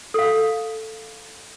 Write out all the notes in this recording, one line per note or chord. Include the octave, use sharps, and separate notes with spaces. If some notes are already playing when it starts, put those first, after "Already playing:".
A4 F5